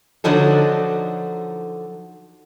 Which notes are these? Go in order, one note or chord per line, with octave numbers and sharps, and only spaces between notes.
D3 F3 F#3 D#4 A4